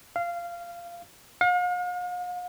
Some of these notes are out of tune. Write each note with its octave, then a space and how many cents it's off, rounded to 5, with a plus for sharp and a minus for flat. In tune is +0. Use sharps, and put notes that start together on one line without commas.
F5 -15
F5 +45